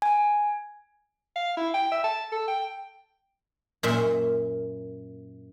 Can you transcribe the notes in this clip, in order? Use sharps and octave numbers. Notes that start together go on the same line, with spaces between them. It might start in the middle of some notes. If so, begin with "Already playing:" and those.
G#5
F5
E4
G5
E5
A5
A4
G5
F#2 A#2 E5 C6